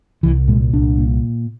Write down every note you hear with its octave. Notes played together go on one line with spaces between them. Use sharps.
C2 E3
A#2 G#3
C2 D4
A#2